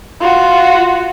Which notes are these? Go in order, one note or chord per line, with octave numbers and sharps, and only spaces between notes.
F4 F#4